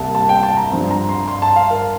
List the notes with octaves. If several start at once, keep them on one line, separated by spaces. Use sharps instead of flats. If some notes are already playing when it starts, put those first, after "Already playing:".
Already playing: C2 C3 G3 A#3 A5
A5
G5
A5
A#5
G2 F3 C4
A#5
C6
C6
A5
F5
A#4